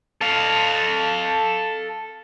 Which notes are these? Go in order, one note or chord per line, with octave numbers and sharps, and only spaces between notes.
A4 F5